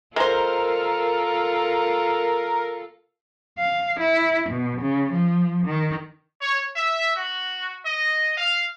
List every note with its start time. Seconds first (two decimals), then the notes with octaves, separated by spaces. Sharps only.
0.16 G#3 F4 A4 A#4 C5
3.59 F5
4.00 E4
4.50 B2
4.81 C#3
5.12 F3
5.66 D#3
6.41 C#5
6.76 E5
7.15 F#4
7.85 D#5
8.37 F5